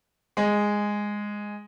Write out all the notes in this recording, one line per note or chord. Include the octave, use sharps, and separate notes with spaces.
G#3